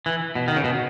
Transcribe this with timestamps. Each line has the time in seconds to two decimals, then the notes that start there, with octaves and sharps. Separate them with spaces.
0.06 E3
0.35 B2
0.48 D#3
0.56 C#3
0.64 B2